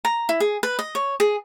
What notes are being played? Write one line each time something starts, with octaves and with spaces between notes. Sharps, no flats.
A#5
E4
G#4
B4
D#5
C#5
G#4